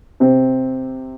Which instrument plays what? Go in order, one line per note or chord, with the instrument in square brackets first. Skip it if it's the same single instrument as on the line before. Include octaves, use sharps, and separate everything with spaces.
[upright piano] C3 C4